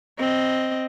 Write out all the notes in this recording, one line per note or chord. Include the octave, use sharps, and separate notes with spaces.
C4 D#5